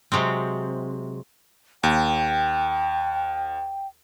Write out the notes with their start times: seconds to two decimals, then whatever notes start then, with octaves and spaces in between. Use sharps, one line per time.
0.12 C3 F#3 G#3 C4
1.83 D#2 G5